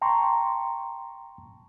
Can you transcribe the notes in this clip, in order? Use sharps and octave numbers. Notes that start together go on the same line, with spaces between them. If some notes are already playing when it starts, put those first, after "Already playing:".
G5 A5 A#5 C6 C#6